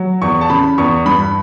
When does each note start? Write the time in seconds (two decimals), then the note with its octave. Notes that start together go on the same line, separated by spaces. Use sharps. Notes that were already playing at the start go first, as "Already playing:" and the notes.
Already playing: F#3
0.22 E2 C#6
0.41 A5
0.50 C#3 B5
0.78 E2 C#6
1.05 G2 B5